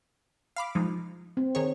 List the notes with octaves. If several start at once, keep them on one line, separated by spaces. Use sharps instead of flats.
F5 B5 D6
F3 G#3 D#4
C4
D#3 G#4 C#5